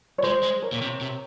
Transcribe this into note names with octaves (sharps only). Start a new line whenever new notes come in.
C#5
G#3 C5
G#3
A#4 C#5
A#2
C3
C3